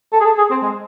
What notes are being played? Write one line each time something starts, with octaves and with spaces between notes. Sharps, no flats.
A4
G#4
A4
G#4
C4
G#3